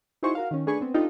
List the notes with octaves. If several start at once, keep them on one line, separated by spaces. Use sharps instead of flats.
D#4 E4 F#4 G#4 C5 C#6
F#4 A#4 F5
D#3 C#4
A3 D4 G#4 B4 G#5 C#6
B3 C4
D4 D#4 F4 G4 A4